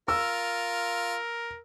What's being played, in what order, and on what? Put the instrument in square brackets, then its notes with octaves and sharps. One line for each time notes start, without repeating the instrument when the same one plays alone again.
[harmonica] F4 [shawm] A#4 [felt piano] E6